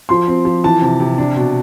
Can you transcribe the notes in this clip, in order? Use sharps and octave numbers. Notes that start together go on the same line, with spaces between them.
F3 C6
C4
F3
E3 A5
C3
C3
D4
B2